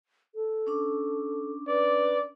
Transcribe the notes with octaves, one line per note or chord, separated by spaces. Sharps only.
A4
C#4 D4 D6
B4 D5